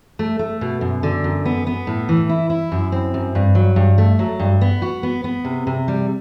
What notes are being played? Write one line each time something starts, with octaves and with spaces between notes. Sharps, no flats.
A3
A3
B2
F#2
D3
F#2
B3
B3
A2
E3
E4
E4
F#2
C4
F#2
G2
F#3
G2
A3
F#3
G2
B3
F#4
B3
B3
C3
C3
G3